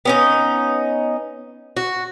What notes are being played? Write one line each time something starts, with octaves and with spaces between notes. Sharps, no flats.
B3 C#4 D#4
F#4